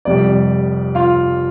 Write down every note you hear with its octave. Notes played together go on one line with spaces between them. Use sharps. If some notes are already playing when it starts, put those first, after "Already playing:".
F1 F2 C3 G3 D5
F4 F5